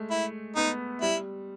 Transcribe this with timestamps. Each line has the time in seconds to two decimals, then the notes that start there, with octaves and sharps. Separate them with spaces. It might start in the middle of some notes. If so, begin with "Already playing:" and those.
Already playing: G#3 A3
0.11 E4
0.56 B3 D#4
1.02 G3 E4